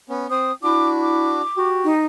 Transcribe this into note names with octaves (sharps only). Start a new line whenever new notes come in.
B3 C#4
C4 C5 D#6
D4 E4 F#4 D6
D6
F#4 G4
D#4